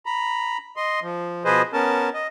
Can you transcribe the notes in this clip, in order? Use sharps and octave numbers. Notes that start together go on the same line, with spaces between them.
A#5 B5
D#5 C6
F3
B2 F3 G#4 B4 C5 D#5
B3 C#4 A#4 A5
D#5